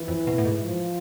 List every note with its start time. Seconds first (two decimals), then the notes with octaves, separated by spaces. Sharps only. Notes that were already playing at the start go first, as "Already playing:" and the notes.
Already playing: E3 E4
0.08 F2
0.27 B2
0.38 A2
0.45 G#2
0.64 F3 F4